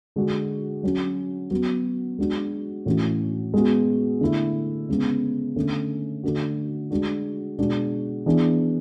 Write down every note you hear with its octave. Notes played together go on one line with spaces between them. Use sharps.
D3 G#3 D4 F#4
F#3 C#4 F#4
F#3 B3 F#4
G#3 D4 F#4
A2 E3 A3 C#4 F#4
G#3 B3 F#4
D3 A3 E4
C#3 G#3 B3
D3 A3 C#4
D3 A3 D4 F#4
G#3 D4 F#4
B2 G#3 D4 F#4
E3 B3 D4 G#4